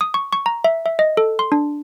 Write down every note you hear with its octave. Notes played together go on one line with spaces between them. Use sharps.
D#6
C#6
C#6
A#5
E5
E5
D#5
A4
C6
D4